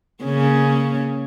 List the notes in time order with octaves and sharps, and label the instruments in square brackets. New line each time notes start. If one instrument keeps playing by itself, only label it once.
[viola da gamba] C#3 A#3 C#4